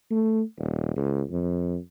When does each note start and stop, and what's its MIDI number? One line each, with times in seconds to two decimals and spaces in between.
0.11 0.41 57
0.59 0.94 27
0.96 1.22 37
1.31 1.78 41